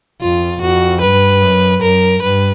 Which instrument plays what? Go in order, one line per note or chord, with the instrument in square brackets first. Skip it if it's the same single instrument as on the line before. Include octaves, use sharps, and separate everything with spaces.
[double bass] F2 [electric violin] F4
[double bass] F2 [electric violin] F#4
[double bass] G2 [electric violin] B4
[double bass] F#2
[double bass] F#2 [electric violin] A#4
[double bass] G2 [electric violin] B4